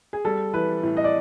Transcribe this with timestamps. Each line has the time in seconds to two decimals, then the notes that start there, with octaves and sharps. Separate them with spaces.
0.13 G#4
0.25 G3 A4
0.53 E3 B4
0.83 A2
0.97 D#5
1.04 D5